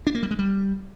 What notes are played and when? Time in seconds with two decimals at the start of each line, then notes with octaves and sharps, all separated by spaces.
0.07 D4
0.15 A#3
0.23 G3
0.31 G#3
0.39 G3